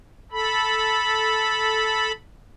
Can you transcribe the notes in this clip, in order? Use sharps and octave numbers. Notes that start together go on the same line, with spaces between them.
A4 B5